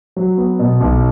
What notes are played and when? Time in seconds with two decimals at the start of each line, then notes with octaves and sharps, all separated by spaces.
0.16 F#3
0.38 B3
0.59 B2
0.80 B1